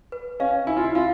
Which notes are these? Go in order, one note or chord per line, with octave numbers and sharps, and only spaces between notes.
B4
C#4 F5
E4 G#5
F4
E4
F4 F5